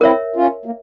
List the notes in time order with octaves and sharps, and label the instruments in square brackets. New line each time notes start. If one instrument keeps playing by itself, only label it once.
[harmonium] C4 E4 [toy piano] A#4 C#5 E5
[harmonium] C#4 F4
A#3